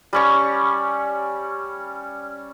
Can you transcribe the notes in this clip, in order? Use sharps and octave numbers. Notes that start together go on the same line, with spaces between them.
G3 C#4 C#6